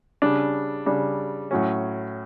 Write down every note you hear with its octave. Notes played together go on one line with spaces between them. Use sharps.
C#3 G3 D4
C#3 G3 D4
A2 F#3 C#4